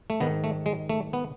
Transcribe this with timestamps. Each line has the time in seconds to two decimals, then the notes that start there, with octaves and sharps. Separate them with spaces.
0.10 A3
0.20 G#2 D#3 B3
0.44 A3
0.66 G#3
0.90 A3
1.13 B3